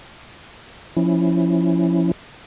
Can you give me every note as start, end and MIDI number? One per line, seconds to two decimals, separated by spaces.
0.96 2.11 53
0.96 2.11 61
0.96 2.11 64